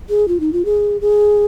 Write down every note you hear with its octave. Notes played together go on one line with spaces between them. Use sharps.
G#4
F4
D#4
F4
G#4
G#4